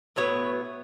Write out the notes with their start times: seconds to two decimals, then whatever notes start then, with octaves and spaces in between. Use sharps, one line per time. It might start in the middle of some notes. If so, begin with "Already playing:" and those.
0.16 A2 F#3 B3 C#5